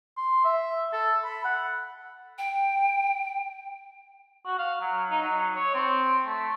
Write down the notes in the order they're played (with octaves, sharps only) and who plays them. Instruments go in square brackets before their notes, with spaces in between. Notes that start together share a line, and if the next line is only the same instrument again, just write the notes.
[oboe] C6
E5
A4
B5
F#5
[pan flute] G5
[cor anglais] F#4
F5
F#3
D#4
F#3
C#5
C4
A3